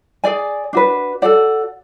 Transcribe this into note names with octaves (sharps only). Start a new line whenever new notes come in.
G#4 D5 G#5
D4 F#4 B4
F#4 A4 D5 F#5